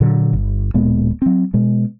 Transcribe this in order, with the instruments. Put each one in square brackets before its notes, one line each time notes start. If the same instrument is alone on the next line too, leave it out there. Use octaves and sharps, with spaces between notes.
[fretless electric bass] A#2 D3 F#3
G1
D1 A#2 G#3 B3
F#3 C4
B2 G#3